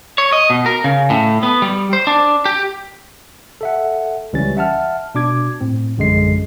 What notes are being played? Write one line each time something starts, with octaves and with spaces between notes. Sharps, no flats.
C#5
D#5
B2
A#4
C#3
A2
B3
G3
C5
D4
G4
A4 E5 F#5
C#2 E3 G3 C#4 A6
E5 F#5 A5 F6
B2 D4 D6 G#6
A2 C4
A#1 F#2 D3 G#3 C7